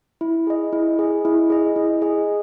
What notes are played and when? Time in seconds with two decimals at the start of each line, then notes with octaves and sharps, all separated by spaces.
0.21 E4
0.47 G#4 D#5
0.73 E4
0.99 G#4 D#5
1.25 E4
1.50 G#4 D#5
1.76 E4
2.02 G#4 D#5